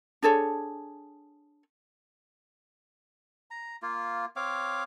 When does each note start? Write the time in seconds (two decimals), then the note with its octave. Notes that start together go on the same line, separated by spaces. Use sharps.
0.22 D4 G#4 A4 C#5
3.51 A#5
3.82 A#3 F4
4.36 C4 C#5 F5 D6